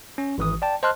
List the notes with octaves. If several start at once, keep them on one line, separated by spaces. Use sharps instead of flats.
C#4
G#1 E3 D#6
D5 G5 A5
C5 D#5 A5 C6 F6 F#6